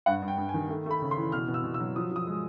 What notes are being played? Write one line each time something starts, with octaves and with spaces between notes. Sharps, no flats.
G2 F#5
G2
G5
G2
G#5
D#3
A3
A3 B5
C#3
C6
E3
B2 F6
B2
E6
B2
E6
F#3
F3 D#6
F3 D#6
G#3